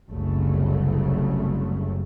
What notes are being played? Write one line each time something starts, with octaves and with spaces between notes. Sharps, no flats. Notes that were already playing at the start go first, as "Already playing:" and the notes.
F#1 C2 F#2 C#3 A3